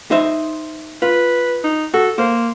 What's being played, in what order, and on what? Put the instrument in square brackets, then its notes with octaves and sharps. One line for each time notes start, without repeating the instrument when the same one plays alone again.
[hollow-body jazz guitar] D#4 C5 E5
[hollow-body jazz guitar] F4 [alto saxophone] B4
[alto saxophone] D#4
[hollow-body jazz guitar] F#4 [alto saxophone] A4
[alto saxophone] A#3 [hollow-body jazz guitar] C5